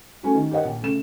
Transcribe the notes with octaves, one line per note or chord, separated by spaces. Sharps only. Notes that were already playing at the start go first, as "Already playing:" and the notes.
A3 C#4 F#4
D#3
G4 A#4 C#5 D#5 F#5
A#1
C#3 A3 E7